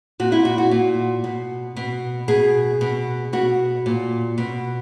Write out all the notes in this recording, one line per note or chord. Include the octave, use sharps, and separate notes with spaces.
A#2 F#4
E4
F#4
F#4
A#2
B2
B2
B2 G#4
B2
B2 F#4
A#2
B2